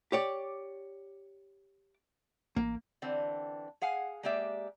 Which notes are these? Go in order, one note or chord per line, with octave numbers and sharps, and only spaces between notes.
G4 C#5 D5
A1 A#3
D3 E3 C4
G#4 F5 F#5 G#5
G#3 A#3 G4 D5 E5